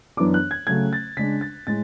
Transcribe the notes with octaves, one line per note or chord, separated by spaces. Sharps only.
F#2 E3 B3 D4 D6
F#6
G#6
C#3 F#3 A3 C#4 G#6
A6
C#3 G#3 D4 B6
A6
A2 G#3 A6